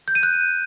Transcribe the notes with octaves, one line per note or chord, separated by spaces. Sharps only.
G6
D#7
F#6